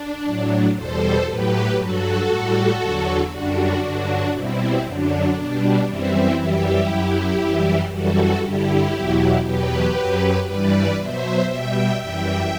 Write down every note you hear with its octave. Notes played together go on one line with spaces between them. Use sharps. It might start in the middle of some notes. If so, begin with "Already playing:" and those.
Already playing: D4
A2 F#3
E2 B2 G3 A4 C5
A2 F#3 G4 B4
G2 F#3 F#4 A4
A2 G3
E2 D3 F#3
F#2 D3 G3 D4 F#4
G2 D3 F#3 D4 F#4
B2 G3 C4 E4
F#2 D3 F#3 D4
B2 G3 D4
F#2 E3 G3 C4 E4
F#2 E3 G3 E4 G4
F#2 F#3
F#2 E3 G3
F#2 E3 G3 F#4 A4
G2 D3 G3 E4 G4
E2 B2 F#3
E2 B2 F#3 G4 B4
F#2 F#3
G2 E3 G3 B4 D5
B2 F#3 C5 E5
B2 G3 E5 G5
F#2 E3 G3 E5 G5